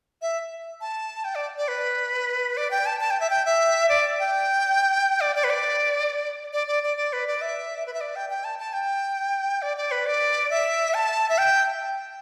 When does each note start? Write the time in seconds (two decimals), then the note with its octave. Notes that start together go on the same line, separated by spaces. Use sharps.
0.22 E5
0.81 A5
1.24 G5
1.35 D5
1.58 D5
1.68 B4
2.57 D5
2.71 G5
2.86 A5
3.00 A5
3.11 G5
3.20 E5
3.30 G5
3.45 E5
3.89 D5
4.19 G5
5.21 D5
5.36 D5
5.44 B4
5.50 D5
6.53 D5
6.68 D5
6.83 D5
6.97 D5
7.13 B4
7.27 D5
7.41 E5
7.86 B4
7.94 E5
8.01 D5
8.16 G5
8.30 G5
8.44 A5
8.59 A5
8.73 G5
9.62 D5
9.77 D5
9.91 B4
10.06 D5
10.50 E5
10.94 A5
11.29 E5
11.38 G5